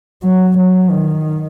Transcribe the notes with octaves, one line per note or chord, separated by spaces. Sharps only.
F#3
F#3
D#3